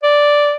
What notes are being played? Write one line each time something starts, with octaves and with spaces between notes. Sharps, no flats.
D5